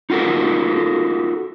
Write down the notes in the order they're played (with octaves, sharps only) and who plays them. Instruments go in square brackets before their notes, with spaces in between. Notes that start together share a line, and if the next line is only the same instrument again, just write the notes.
[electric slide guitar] D#4 F4 F#4 A4 A#4